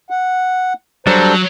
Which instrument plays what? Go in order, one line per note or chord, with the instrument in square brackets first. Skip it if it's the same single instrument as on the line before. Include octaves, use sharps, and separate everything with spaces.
[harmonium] F#5
[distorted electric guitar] F#3 [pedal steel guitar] G3 D4 A4 [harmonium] C5 A#5